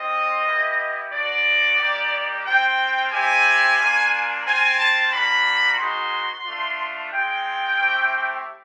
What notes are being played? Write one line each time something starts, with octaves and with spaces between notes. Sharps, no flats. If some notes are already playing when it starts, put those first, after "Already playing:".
Already playing: C4 F4 D#5
B3 E4 G4
B3 D4 F#4 D5
A#3 D#4 G4
C4 F4 G5
C4 E4 G4 G#5
A#3 D4 F4
C4 F4 G#5
A5
A#3 D4 F#4 B5
G#3 B3 D#4 F#4 C6
A3 D4 F4
G#3 C4 F4 G5
A3 C4 E4 G4